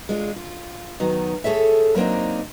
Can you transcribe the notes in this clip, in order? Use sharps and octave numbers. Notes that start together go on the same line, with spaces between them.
G#3 D4 F4
F4
D#3 F#3 B3 D#4
A3 G#4 A4 C#5 E5
F#3 A#3 C4 D4 D#4